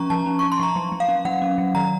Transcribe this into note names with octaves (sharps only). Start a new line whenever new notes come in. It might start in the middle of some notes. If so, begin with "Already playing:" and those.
Already playing: F3 C#4 A#5 C#6
F3 A5
C#4
C#4 C#6
C6
F3 A#5
F#3
F#3
F5
C#4
F#3 F#5
C#4
F#3
D#3 A#5